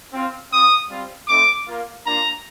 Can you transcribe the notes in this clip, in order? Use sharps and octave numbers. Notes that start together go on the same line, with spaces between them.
C4 F4
C4 F4 D#6
G3 C4 F4
A3 C4 D#4 D6
A#3 F4
A#3 D4 F4 A#5